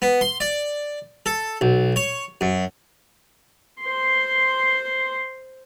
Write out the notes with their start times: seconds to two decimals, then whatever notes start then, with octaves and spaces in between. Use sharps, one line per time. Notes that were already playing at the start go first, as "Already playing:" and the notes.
0.02 B3
0.21 C6
0.40 D5
1.26 A4
1.61 B1
1.96 C#5
2.41 F#2
3.82 C5 C6